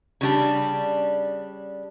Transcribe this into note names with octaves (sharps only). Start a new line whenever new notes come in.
C#3 G3 D4